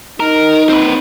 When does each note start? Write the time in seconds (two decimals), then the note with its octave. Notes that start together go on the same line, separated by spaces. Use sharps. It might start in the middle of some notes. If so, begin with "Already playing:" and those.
0.20 D#4 A#4
0.69 C4 B4